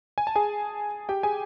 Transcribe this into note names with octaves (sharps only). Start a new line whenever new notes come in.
G#5
A5
G#4 G#5
G4 G5
G#4 G#5